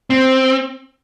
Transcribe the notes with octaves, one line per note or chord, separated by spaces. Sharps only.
C4